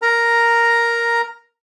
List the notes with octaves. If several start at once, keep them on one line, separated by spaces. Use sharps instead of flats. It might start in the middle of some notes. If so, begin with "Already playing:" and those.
A#4 A#5